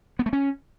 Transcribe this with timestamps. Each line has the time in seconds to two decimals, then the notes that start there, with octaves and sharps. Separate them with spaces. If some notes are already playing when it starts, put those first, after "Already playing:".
0.19 B3
0.26 A3
0.33 C#4